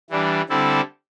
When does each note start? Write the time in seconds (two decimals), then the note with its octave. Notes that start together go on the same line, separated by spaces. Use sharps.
0.10 E3 G3 D4
0.49 D3 G3 C4 E4 A4